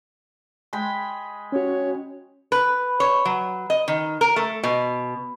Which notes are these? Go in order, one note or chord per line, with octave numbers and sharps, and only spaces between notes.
G#3 G5 B5
C#4 F#4 C#5
B4
C#5
F#3
D#5
D#3
A#4
A3
B2